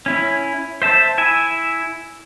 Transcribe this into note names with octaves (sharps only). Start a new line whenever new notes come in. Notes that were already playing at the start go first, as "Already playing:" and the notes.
C#4 E4
C5 E5 A5
E4 E5 G#5